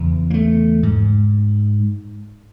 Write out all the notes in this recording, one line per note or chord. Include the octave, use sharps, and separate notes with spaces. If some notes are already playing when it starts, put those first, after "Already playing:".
Already playing: E2 C#3
A#3
A3
G#2